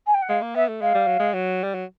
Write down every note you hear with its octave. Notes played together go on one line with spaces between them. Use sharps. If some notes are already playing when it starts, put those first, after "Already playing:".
G#5
G5
F#5
G#3 F5
A#3
B3 E5
A3
G#3 F5
G3
F#3
G#3
F#3
G3
F#3